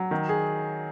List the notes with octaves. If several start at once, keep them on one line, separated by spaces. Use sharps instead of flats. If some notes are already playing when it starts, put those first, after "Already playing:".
Already playing: F#3
D#3
G#4